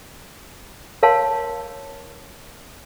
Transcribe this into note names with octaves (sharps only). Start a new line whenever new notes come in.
A#4 C#5 F5 A5 C6